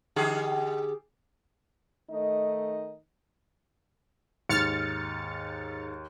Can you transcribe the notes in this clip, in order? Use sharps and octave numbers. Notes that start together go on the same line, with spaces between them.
D3 G4 G#4
D#3 A3 D#4 D#5
D#2 G#2 F6 A6 C#7